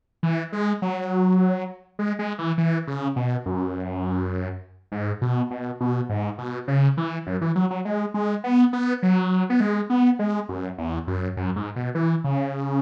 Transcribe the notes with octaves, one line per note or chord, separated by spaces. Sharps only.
E3
G#3
F#3
G#3
G#3
E3
E3
C#3
B2
F#2
G#2
B2
B2
B2
G#2
B2
C#3
E3
F#2
E3
F#3
F#3
G#3
G#3
B3
B3
F#3
B3
G#3
B3
G#3
F#2
E2
F#2
F#2
G#2
B2
E3
C#3